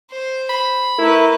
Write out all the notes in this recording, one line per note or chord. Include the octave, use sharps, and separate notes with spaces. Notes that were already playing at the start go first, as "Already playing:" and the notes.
C5
B5
A3 E4 A#4 B4